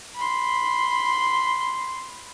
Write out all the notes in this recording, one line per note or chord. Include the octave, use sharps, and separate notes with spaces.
B5 C6